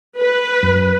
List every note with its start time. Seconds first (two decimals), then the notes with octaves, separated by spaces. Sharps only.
0.18 B4
0.63 F#2